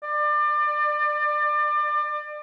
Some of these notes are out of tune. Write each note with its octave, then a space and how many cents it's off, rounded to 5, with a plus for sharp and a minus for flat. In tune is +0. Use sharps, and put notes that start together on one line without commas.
D5 +30